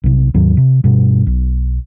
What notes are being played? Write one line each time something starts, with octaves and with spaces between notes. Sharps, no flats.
B1 C3
D#2 G#2 D#3 F#3
C3
G2 B2
B1